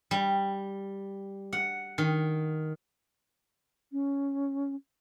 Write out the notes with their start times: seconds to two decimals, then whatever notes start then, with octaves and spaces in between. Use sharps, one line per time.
0.11 G3
1.53 F#5
1.98 D#3
3.92 C#4